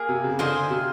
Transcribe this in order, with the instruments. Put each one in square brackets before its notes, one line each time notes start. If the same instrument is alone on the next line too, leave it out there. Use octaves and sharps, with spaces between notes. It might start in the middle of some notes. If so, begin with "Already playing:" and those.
Already playing: [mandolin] A#3 G#4
[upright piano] C3
C#3
[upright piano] D3 [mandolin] F4 G#4 C5 D#5
[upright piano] C3